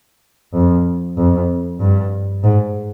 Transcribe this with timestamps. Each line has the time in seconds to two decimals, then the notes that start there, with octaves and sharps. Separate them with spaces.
0.54 F2
1.18 F2
1.81 G2
2.44 G#2